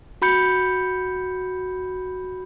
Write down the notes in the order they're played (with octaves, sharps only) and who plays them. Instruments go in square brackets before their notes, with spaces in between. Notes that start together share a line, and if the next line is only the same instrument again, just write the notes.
[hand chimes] F#4 B5 G6 C#7